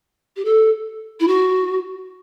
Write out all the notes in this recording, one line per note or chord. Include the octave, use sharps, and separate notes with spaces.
G4
A4
E4
F#4